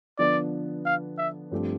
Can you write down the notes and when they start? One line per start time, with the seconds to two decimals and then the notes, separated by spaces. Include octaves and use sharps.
0.18 D3 F3 B3 D4 D5
0.85 F5
1.18 E5
1.51 G2 F3 A3 C4 G4